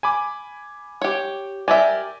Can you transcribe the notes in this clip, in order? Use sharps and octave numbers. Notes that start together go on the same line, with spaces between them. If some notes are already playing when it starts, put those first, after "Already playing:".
G#5 B5 D6
G4 C#5
G4 A#4 D5 E5 G#5